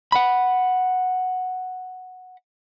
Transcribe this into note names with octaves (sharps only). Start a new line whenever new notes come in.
F#5 B5